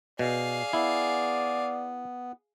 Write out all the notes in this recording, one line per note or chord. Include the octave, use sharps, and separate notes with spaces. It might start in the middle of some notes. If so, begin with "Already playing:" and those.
B2 G#4 D5 F5
B3 E4 D5